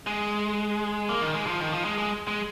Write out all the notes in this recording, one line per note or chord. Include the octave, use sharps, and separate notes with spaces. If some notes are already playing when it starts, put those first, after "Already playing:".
G#3
A#3
D#3
G#3
F3
D#3
F3
G#3
G#3
G#3